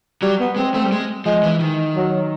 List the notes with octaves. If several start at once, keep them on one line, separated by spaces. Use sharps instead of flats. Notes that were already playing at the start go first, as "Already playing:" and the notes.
F#3 G3
B3
G#3 C4
A3 C4
G3
G#3
F3 G#3
E3
D#3
F#3